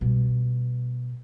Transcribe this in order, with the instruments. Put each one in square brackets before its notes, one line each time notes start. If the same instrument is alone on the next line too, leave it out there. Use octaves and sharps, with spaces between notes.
[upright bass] B2 G3